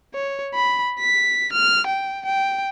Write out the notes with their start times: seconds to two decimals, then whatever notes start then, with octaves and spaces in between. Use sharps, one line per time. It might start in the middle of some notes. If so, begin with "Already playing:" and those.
0.14 C#5
0.54 B5
1.00 B6
1.52 F6
1.87 G5
2.26 G5